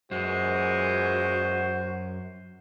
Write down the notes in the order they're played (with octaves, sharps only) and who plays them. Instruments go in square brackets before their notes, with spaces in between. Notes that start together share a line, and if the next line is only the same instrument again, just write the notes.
[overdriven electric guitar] F#2 [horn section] A#2 E3 G#3 [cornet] F#4 [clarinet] C5